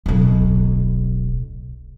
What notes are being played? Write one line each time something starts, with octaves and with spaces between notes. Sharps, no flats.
D1 B1